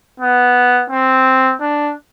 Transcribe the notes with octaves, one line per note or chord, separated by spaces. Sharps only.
B3
C4
D4